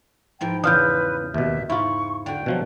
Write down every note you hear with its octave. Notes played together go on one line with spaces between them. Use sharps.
G#2 F3 E4 G5
E2 C#3 D4 F4 B4 D#6 F6 G6
D#2 B2 E5
G#2 E4 F4 B5 C#6
D3 F#4 G5
B2 F3 F#3